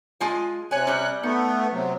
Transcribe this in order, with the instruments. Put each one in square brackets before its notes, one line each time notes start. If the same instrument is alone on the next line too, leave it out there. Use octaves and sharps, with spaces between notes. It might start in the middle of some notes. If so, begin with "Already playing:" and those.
[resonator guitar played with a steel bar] G#3 F4 G#5
[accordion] C3 F#6 [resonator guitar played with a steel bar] C#5 G#5
[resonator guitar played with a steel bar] G3 C#4
[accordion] A3 B3 [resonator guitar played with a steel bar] D#4
[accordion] C3 F#3